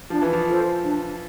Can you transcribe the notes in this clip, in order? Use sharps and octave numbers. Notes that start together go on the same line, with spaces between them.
F3 D4
E3
F3
F4 A4 C5
D4